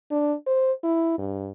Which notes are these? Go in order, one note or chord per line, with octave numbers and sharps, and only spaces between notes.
D4
C5
E4
G2